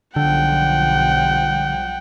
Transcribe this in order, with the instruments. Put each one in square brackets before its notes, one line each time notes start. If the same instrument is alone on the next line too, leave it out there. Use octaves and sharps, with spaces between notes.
[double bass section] B1 F3 G3 [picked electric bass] D3 [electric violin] F#5 G5